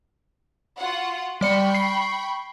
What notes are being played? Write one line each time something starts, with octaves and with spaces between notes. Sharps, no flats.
F4 F#4 F#5
G3 D5 G5 B5 C#6 C#7
C7